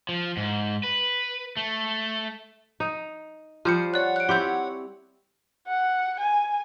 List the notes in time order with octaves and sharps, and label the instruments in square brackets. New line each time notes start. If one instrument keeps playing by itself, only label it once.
[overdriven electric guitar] F3
G#2
B4
A3
[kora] D#4
[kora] F3 G3 C5 [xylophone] F6 G6 C#7
[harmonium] C#5 F#5 [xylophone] D5 F#6
[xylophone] F#6 D7
[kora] C4 E4 G4 [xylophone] C6 G6
[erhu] F#5
G#5